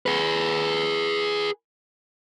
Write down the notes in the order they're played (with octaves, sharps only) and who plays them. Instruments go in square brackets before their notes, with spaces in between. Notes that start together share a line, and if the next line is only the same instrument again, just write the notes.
[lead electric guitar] G#4 B4